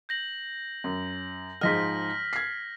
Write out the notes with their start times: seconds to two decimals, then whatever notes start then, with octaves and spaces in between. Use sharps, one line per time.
0.09 G6 A#6 F#7
0.84 F#2
1.61 G#2 F3 D#5 F6 A#6 B6
2.33 G#6 C7